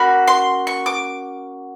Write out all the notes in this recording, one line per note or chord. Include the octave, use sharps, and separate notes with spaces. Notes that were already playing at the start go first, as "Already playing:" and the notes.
Already playing: A#3 C#4 F#4 B5
C6
C#6
D6